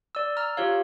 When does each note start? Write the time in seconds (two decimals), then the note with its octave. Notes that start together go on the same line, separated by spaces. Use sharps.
0.15 D5 E6
0.37 A#5 E6 F6
0.57 F4 G4 C#5 F5